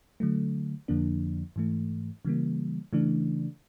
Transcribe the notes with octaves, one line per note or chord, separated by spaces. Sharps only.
D3 F#3 A3
F2 D3 F3 A#3 D4
G#2 E3 A3
C#3 E3 G3 A#3
C#3 E3 A3 D4